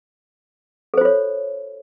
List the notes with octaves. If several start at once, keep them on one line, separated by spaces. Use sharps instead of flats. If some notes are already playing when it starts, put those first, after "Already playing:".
F4 A4 C5 C#5